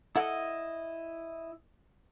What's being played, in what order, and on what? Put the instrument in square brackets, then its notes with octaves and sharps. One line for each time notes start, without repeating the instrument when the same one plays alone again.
[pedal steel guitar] E4 D#5 [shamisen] A4 F#5